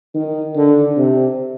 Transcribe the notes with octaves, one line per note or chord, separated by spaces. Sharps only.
D#3
D3
C3